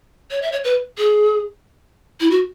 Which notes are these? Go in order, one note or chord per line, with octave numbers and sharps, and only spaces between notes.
C#5
E5
C#5
B4
G#4
E4
F#4